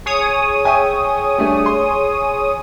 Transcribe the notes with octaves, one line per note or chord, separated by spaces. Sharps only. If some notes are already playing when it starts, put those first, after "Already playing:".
G#4 C#5 D#6
E5 G5 G#5
G3 A3 D4
C6